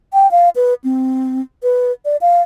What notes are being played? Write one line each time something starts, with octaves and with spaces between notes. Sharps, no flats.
G5
F5
B4
C4
B4
D5
F5